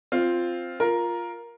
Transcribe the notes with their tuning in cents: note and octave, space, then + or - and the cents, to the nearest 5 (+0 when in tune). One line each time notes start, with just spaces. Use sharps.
C4 +0 F4 +0
F4 +0 A#4 +10